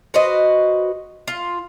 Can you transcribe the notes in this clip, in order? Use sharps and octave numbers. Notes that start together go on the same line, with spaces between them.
F#4 B4 C5 D#5
F4